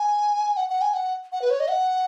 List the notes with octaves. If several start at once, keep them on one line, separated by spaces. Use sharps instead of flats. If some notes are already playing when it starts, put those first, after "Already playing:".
Already playing: G#5
F#5
F#5
G#5
F#5
F#5
B4
C#5
D#5
F#5